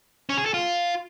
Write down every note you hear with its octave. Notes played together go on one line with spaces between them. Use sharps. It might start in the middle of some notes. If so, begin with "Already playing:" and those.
C#4
G#4
A4
F4